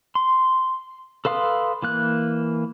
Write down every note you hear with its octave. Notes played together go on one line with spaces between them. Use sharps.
C6
A4 B4 F5 C6 D#6
E3 A#3 F#6